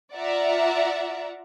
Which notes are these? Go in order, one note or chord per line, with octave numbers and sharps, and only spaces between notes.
F4 D5 E5 F#5 A#5